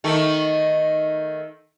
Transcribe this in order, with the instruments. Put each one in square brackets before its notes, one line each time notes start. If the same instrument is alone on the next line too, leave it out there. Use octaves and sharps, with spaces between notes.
[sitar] D#3 A3